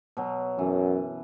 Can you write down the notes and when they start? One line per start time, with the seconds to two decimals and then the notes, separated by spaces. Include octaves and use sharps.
0.17 B2 F#3
0.59 F#2 E3